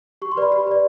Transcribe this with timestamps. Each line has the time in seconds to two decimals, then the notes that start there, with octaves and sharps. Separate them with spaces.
0.22 G4 C#6
0.32 C6
0.37 B4 D5 B5
0.52 G4 B5
0.67 B4 D5